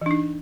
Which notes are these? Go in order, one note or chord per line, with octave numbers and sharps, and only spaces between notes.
E3 D4 D#4